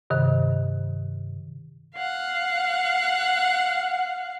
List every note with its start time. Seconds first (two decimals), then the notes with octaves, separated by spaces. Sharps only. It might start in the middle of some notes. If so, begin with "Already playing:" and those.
0.10 G2 C3 D#3
1.96 F5 F#5